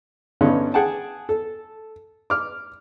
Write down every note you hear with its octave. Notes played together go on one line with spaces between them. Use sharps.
G2 D3 B3 C#4 D#4
G#4 F#5 G5 A5
A4
D6 F6